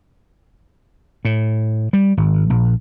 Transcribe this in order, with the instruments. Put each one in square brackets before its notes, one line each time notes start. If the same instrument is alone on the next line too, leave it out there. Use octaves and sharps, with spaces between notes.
[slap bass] A2
G3
G#1
A#1